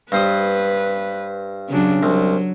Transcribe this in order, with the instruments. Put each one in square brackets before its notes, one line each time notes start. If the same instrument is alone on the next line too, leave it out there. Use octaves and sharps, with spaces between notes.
[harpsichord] G2 C5 D#6 [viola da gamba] B4
[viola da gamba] C#3 F#3 D4
[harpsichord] C2 [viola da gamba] F#3